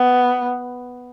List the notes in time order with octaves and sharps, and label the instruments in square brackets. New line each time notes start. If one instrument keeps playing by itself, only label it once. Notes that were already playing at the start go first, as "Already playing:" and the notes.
Already playing: [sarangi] B3